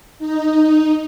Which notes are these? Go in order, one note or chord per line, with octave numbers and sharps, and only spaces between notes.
D#4